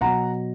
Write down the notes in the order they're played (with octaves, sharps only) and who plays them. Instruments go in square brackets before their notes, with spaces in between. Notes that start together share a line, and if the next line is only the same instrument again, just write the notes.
[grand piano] B2 F#3 F#5 A#5